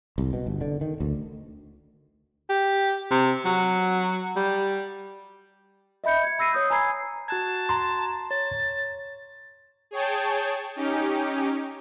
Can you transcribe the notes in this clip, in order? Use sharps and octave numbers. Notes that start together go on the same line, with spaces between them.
C2
B2
G1
D3
D#3
D2
G4
C3
F#3
G3
D#5 E5 B5 G6 C#7
G#6 C#7
B5 E6 A#6 C7 D#7
C#5 D#6 G6
G#5 A#5 B5 E6 G#6 C7
F#4 A5 F#6 G#6
A#5 C6
C#5 A6
G#4 C#5 G5 A5
C#4 D#4 G4